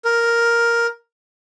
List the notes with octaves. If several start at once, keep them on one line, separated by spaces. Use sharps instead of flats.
A#4